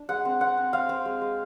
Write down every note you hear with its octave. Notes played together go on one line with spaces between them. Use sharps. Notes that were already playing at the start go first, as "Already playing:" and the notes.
Already playing: D4
G#3 F#5
C4
C4 F#5
C4
C4 F5
C4
G#3
G#3